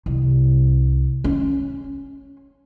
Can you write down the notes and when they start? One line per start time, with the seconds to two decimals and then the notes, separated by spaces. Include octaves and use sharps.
0.06 C2
1.24 C#4